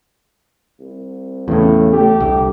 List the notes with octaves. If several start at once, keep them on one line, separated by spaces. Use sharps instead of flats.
C2
E2 A2 C#3
A3 G4
C2 D3